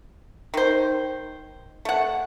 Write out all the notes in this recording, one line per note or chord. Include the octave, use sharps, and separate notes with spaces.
D#3 C5
A3 F#5